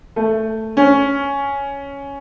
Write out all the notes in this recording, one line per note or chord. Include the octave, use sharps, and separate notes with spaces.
A3
C#4